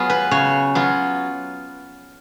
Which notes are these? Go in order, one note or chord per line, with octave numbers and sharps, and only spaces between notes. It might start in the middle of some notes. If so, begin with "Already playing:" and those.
Already playing: F#3 B3 F4 G#4
B4
C#3 C#5
F#3 B3 F4